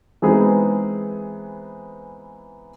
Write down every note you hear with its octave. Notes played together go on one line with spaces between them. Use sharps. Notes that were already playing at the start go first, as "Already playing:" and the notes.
E3 G#3 B3 C4 D#4 G#4